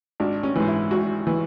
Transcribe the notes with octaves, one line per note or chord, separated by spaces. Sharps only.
G#1 D4
C#4
G#2 E3
E4
G#1 F#4
E3